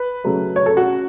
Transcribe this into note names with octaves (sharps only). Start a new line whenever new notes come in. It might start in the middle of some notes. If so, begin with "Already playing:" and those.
Already playing: B4
C#3 F#3 A3
C#5
A4
F#4